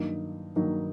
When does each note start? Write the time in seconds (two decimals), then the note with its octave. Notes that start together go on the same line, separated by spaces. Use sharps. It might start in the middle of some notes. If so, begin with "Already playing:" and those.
Already playing: G2 D#3 F#3 A#3 D#4
0.56 G2 D#3 F#3 A#3 D#4